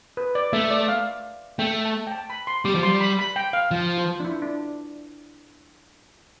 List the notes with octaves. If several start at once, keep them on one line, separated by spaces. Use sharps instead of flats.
B4
D5
A3 E5
D5
F5
A3 G5
A5
G5
A5
B5
C6
G3 D6
F3
G3 C6
B5
B5
G5
F5
F3
F4
D4
E4
D4